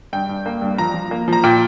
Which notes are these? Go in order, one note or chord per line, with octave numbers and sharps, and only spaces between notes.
G2 G5
G2
A#3
G2
F3 A#5
F3
A#3
F3 A#5
A#2 G5